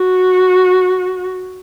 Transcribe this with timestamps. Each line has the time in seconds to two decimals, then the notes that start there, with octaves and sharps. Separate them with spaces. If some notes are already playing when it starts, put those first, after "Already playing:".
Already playing: F#4